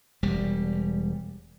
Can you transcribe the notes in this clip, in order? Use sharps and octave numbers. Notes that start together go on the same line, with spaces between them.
E1 G3